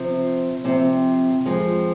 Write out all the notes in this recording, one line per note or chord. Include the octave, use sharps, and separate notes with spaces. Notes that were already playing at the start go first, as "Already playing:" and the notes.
Already playing: C3 F3 C4
C3 F3 C4
F2 F3 G#3